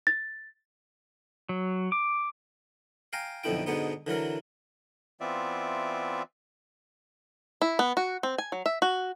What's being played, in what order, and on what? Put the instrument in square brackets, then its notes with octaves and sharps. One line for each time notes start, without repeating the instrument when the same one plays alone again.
[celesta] A6
[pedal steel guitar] F#3
D6
[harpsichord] F5 G5 G#5 A#5
B1 F2 B2 D3 E4 G5
G#2 B2 D3 B3 D#4
D3 E3 F#3 A#4
[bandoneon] E3 B3 C4 F4 D5 E5
[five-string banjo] E4
B3
F#4
C4
G#5
F#3
E5
F#4